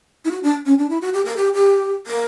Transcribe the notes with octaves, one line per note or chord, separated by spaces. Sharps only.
E4
F#4
D4
C#4
D4
E4
F#4
G4
A#4
G4
G4
A#4